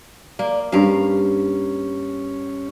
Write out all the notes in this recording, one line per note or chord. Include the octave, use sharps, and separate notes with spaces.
A#3 D5
G2 C#4 A#4 F5